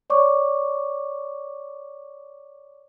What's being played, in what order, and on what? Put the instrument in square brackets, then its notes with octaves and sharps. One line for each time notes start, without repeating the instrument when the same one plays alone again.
[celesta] C#5 D5 C#6 D6